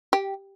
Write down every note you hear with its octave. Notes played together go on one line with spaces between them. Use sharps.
G4